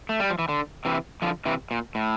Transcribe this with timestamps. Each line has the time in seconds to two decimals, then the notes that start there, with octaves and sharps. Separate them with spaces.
0.09 A3
0.20 G3
0.30 F3
0.39 E3
0.49 D3
0.85 C3 E3
1.22 D3 F3
1.46 C3 E3
1.71 A#2
1.95 A2